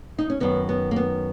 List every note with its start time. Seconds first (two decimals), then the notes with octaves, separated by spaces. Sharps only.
0.18 D#4
0.30 C#4
0.40 F#2 D#3 B3
0.69 B3
0.91 A#3
0.96 B3